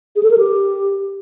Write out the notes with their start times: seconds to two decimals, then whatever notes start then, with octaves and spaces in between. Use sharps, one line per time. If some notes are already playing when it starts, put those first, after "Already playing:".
0.16 G#4
0.23 A4
0.30 A#4
0.38 G4